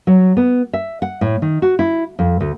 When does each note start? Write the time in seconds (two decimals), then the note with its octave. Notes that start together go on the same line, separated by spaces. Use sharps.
0.07 F#3
0.37 B3
0.73 E5
1.02 F#5
1.21 A2
1.42 D#3
1.62 F#4
1.79 E4
2.19 F2
2.40 D2